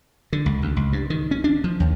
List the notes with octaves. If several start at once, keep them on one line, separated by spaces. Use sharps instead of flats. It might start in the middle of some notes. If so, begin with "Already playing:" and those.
D3
C#2
D2
C#2
G2
D#3
C#4
D4
F3
D#2